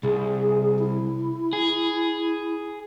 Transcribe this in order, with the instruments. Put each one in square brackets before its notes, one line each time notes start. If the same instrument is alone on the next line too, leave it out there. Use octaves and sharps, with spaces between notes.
[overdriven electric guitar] C2 [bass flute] G#4
[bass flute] E4
[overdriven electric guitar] G#4